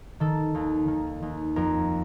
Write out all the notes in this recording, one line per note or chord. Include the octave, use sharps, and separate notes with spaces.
D#3 A4
D#2
D#3
D#2
F2 A#4